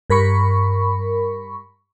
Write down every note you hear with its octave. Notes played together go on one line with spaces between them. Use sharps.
G2 A#4 B5 C#6